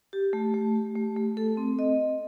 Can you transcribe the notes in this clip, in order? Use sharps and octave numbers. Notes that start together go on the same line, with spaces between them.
G4
A3
A3
G4
A3
A3
A4
C4
D#5